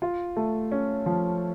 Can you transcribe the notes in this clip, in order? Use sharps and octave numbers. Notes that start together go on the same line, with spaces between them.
F4
A3
C#4
F3